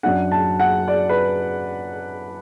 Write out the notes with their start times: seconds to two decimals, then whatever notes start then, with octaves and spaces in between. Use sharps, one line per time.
0.03 F#2 F#3 D4 F#5
0.31 A5
0.60 F#5
0.88 D5
1.09 B4